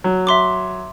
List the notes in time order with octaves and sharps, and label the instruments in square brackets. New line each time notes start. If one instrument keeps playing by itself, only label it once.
[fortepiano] F#3
[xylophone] E5 C6 D6